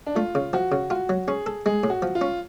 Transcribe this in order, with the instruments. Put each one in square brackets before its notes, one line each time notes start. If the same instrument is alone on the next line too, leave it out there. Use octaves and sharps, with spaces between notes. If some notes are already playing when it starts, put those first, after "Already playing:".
[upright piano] D4
[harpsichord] A3 [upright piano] F4
[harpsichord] C#3
[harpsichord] F3 [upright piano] F#4
[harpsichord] C#3
[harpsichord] F4 [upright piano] F#4
[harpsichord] F#3
[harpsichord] C#4 [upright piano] G#4
[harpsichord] A4
[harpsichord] G#3 [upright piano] G#4
[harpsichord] A2
[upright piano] F#4
[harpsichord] F3
[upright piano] F4
[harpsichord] C#4